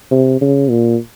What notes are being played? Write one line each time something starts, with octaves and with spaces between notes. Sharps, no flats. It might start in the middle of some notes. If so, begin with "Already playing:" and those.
C3
C#3
A#2